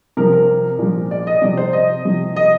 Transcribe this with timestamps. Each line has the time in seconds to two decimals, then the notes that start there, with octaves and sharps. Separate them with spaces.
0.17 C3 F3 A#4
0.33 A#4
0.79 A#2 F3
1.11 D5
1.27 D#5
1.42 C3 F3 D5
1.57 C5
1.73 D#5
2.05 C3 F3
2.36 D#5